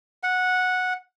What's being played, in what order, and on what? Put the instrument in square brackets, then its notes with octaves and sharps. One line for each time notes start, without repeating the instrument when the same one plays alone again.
[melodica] F#5